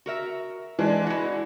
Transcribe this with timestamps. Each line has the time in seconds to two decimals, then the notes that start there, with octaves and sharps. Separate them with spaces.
0.06 F#4 A#4 E5
0.79 E3 G#3 D4
1.06 E4 F#4